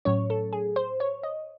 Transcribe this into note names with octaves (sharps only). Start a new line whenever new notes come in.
A2 F#3 C#4 C#5
A4
G#4
C5
C#5
D#5